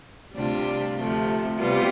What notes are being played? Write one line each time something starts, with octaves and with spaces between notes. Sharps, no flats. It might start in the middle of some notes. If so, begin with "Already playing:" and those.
D2 C3 G3 D4 F4
D2 C3 F3 A3
C3 G3 B3 F4